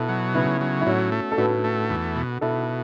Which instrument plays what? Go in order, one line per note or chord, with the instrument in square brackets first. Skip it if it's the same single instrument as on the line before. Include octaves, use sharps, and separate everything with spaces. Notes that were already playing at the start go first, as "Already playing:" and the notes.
Already playing: [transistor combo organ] B2 [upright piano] E4 A4
[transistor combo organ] F#3
[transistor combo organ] C#3 [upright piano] B3 E4
[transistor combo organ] F#3
[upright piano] E4
[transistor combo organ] A2 [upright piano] C#4 F#4
[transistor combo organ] A3
[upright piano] A4
[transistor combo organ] A2 [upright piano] F#4 B4
[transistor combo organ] A3
E2
B2
[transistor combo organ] B2 [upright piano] E4 A4